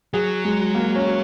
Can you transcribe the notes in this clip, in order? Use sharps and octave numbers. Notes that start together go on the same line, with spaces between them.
F#3 G#4
G#3
A#3
C#4